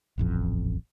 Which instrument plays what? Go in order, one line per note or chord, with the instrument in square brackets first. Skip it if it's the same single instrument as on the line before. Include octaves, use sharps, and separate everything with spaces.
[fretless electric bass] D#1 A1 F2